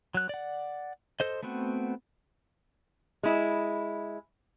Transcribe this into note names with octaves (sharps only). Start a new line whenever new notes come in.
F#3 F#6
D5 F#5
A4 C5 D#5
A3 B3 C4 F#4
G#3 E4